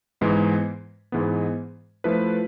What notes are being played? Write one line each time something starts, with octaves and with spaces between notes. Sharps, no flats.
G#2 E3 G#3 B3
G#2 E3 G#3 B3
F3 A3 E4 B4